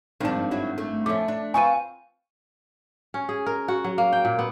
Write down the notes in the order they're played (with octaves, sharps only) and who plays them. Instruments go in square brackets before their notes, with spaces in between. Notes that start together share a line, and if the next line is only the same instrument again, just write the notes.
[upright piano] G#1 G2 [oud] F3 D4
[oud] F#3 E4 F#4
A3
[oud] F3 C#4 [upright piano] A3 [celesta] D6
[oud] D4
[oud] C4 F4 B4 [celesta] G#5 D#7 [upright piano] C#6
[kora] C#4
G#4
A#4
F#4
F#3
A#3
G5
A#2
B3